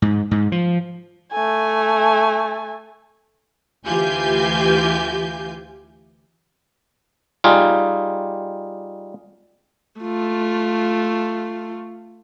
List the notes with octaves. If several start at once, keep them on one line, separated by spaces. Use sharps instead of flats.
G#2
G#2
F3
A3 G#5
D2 E3 F4 G4 G#5 G6
G3 D#4 F4 G#4
A3 F4